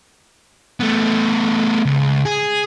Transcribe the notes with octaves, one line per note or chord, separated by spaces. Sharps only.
A3 B3
C#2
G#4